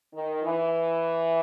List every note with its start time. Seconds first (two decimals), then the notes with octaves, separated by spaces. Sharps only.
0.14 D#3
0.43 E3